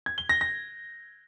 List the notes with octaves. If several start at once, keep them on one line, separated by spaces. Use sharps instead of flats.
G#6
G7
A#6
A#6